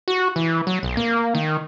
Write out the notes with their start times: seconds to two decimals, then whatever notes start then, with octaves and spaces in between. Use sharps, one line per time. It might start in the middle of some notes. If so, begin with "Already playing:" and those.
0.08 F#4
0.36 E3
0.67 F#3
0.83 B1
0.97 A#3
1.35 D#3